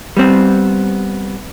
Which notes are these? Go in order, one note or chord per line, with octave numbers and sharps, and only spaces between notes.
G3 B3 C4